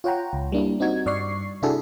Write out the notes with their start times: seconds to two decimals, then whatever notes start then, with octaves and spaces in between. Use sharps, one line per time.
0.04 F4 C#5 F#5 G5 A#5
0.33 C#2
0.52 G3 A#3 D4 E4
0.80 C4 D#4 F#4 G#6
1.06 G2 D5 C#6 C7
1.62 C3 D4 E4 F#4 G#4 A4